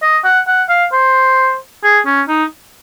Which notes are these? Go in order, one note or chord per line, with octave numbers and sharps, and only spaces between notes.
D#5
F#5
F#5
F5
C5
G#4
C#4
D#4